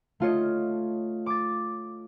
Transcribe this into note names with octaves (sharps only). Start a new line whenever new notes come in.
A3 F4 C#5 D#5
D6 A6